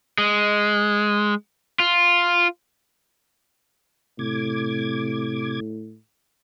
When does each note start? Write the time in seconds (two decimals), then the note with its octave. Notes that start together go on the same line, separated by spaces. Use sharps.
0.18 G#3
1.80 F4
4.19 A2 C3 D6 G#6